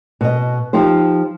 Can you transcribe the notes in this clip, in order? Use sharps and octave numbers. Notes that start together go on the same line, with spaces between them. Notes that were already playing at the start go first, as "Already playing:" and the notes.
B2 D#5
F3 D#4 G4 C5